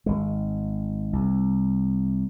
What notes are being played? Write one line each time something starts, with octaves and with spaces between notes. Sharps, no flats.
G#1 G#3
C2